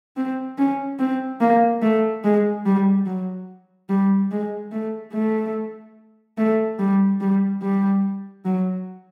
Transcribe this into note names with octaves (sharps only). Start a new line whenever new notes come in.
C4
C#4
C4
A#3
A3
G#3
G3
F#3
G3
G#3
A3
A3
A3
G3
G3
G3
F#3